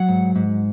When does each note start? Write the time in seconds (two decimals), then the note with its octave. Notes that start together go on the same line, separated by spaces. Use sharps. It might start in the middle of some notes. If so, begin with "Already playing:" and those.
Already playing: F#3 F#5
0.09 G#2
0.36 G#2